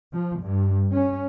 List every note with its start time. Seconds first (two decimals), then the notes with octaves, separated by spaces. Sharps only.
0.13 F3
0.42 G2
0.91 C#4